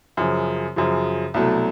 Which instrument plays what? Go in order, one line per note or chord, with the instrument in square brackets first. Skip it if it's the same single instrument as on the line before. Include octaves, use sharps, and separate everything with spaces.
[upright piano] F#2 C#3 F3
F#2 C#3 F3
C2 B2 F#3 A3